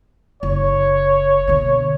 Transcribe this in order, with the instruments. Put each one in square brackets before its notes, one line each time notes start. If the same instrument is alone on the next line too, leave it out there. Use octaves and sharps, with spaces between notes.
[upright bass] F#1 [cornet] C#5
[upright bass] B2 D3